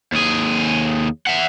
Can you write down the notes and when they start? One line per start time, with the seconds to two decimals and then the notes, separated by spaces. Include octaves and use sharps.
0.12 D#2 G#4
1.27 E5 F#5